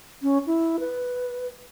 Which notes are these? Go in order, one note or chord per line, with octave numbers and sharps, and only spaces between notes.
C#4
E4
B4